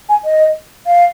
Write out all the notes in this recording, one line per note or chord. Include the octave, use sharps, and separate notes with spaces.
G#5
D#5
F5